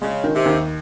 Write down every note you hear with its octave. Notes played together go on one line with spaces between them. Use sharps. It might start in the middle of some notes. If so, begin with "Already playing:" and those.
C#3 G#3
D#3
C3
D#2